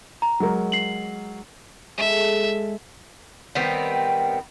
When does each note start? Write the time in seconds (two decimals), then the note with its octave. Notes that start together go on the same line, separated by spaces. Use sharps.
0.22 A#5
0.40 F#3 G#3 A#4
0.72 C7 F#7
1.98 G#3 A4 E5
3.55 D#3 G3 B3 C4